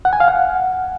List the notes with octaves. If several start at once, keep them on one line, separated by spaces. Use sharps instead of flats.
F#5
G#5
F5
F#5